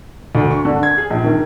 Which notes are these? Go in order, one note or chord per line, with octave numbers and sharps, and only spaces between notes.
D2
C#6
D3
G#6
G#4
A#1
D#3